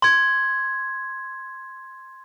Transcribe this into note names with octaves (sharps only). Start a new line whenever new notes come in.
C6 G#6